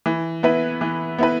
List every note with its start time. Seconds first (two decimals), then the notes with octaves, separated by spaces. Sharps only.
0.06 E3
0.43 B3 E4 B4
0.81 E3
1.18 B3 E4 B4